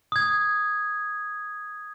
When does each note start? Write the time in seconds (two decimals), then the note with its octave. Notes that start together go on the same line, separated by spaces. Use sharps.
0.12 D#6 G#6